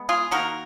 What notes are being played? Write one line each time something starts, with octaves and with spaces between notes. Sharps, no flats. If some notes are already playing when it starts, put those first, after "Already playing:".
Already playing: G#3 B3
F4 G#4
D#3 A#3 F#4 A#4